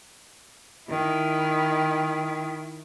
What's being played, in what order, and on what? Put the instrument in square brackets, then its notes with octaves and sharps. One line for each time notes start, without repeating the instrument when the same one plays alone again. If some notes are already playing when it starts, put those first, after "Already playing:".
[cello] D#3 E4